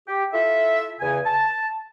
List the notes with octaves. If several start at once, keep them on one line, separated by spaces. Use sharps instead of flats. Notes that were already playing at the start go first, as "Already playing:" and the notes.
G4
E4 F4 A4 E5
E2 C#3 G#5
A5